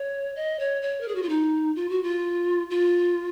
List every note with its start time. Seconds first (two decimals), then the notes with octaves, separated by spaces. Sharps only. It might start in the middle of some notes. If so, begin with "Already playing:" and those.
Already playing: C#5
0.36 D#5
0.60 C#5
0.82 C#5
1.01 A#4
1.08 G#4
1.15 F#4
1.23 F4
1.29 D#4
1.76 F4
1.90 F#4
2.03 F4
2.70 F4